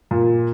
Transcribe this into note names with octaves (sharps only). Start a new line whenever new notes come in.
A#2